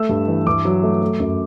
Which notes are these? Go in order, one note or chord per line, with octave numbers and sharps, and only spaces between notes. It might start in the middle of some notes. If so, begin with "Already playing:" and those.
Already playing: A3 E6
G2
E3
G2 D6
F#3
A3
A3
F#2